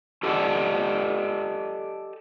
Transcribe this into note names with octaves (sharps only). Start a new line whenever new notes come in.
G4 A4 D5 D#5 F#5 A5